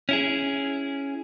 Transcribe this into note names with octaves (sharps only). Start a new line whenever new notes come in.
C#4 E4 G#4